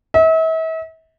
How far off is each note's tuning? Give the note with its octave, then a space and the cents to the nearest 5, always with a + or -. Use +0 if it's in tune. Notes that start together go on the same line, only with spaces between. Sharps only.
E5 -40